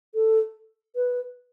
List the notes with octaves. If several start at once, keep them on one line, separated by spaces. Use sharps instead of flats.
A4
B4